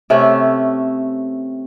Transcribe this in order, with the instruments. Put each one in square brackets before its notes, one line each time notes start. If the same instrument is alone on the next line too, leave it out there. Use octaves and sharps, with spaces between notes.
[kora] C3 A3 C#4